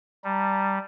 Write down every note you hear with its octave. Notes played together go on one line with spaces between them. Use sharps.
G3 A5 A#5